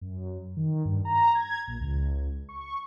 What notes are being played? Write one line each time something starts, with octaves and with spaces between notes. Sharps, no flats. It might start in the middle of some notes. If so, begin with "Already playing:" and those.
F#2
D#3
G2
A#5
G#6
A#1
C#2
C#6